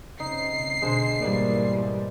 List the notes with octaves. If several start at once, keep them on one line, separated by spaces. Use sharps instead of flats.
C#3 C4 D#4 C7
B2 D3 G#3 C5
G#2 B2 E3 G3 A#3 D5